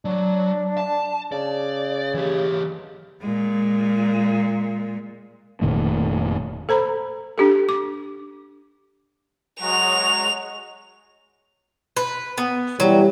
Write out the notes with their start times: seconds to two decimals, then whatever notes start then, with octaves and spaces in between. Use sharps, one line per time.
0.05 F#3 D4
0.78 A5
1.32 C#3 D5
2.14 E3 G4
3.20 A#2 G#3
5.61 F1 A#2 D#3 A3
6.69 A4 C5 A#5 B5
7.38 D4 G4 A4
7.69 D6
9.61 F#3 G#3 F#4 F7
11.97 B4
12.38 B3
12.80 E3 F#3 G3